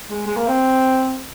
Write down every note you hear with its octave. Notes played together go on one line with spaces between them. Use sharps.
G#3
G#3
A#3
C4